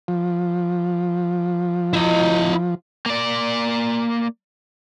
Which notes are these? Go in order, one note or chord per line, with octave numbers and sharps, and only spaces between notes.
F3
E4 D#5
A#3 D5